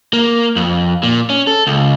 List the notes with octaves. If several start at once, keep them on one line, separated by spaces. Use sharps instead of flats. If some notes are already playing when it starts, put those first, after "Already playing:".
A#3
F2
A#2
C#4
A4
C#2